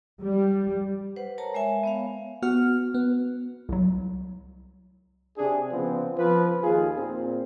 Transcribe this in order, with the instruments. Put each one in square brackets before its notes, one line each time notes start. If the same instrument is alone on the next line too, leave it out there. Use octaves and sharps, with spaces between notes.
[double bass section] G3
[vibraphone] B4 C5 F#5
A#4 C#5 A5 A#5
G#3 C#5 E5 G#5
B3 C#5 F5
[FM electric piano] B3 F#4 F6
B3
[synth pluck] C2 F#3
[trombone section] C3 D4 G#4
C#3 F3 B3 C4
F3 B4
D#2 F4 G#4
A#2 C4